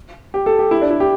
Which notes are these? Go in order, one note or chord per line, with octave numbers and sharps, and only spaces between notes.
G4
A4
G4
E4
D4
E4
G4